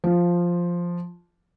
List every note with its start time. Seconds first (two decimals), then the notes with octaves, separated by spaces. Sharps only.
0.04 F3